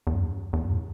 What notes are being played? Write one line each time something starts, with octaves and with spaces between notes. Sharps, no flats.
E2
F#2
E2
F#2
A2